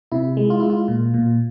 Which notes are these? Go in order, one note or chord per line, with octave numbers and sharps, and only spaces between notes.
C3 E4
G#3
F4
G#3 E4
F4
A#2
A#2